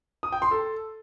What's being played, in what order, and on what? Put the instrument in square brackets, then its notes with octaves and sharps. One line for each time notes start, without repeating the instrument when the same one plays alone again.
[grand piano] D#6
G5
C6
A4